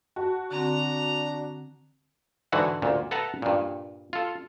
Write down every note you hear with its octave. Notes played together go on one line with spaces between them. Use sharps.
F#4 A5
D3 C4 D4 A#5
G#2 D3 E3 F#4 F#5
D2 A#2
A4 B4 E5 F#5 A5 A#5
G2 A#2
F4 A4